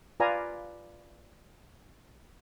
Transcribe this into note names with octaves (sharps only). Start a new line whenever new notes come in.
F4 B4 D5 F5 G#5 A#5